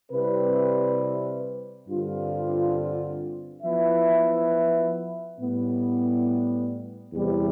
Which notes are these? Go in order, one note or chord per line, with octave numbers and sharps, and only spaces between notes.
C3 G3 C4 E4 B4
G2 D3 G3 C4 F4
F3 B3 E4 B4 E5
A2 G3 B3
E2 C3 G3